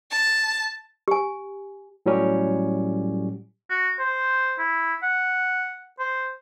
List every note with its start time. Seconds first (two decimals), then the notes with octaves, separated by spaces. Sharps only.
0.11 A5
1.08 G4 G#5
2.06 A2 F#3 G3 C#4 G4
3.70 F#4
3.99 C5
4.59 E4
5.03 F#5
5.99 C5